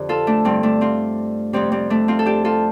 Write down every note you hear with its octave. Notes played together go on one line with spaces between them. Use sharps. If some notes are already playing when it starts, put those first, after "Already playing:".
Already playing: F2 D3 D4 G4
F4 A4
A3 D4
G2 D3 G3 C4
A3 D4
C4 F4
F2 C3 G3 C4
G3 C4
A3 D4
C4 F4
A4
D4 G4
F4 A4